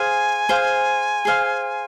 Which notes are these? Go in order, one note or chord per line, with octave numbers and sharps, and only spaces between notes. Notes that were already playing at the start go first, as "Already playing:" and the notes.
Already playing: G#4 C5 F5 G#5
G#4 C5 F5
G#4 C5 F5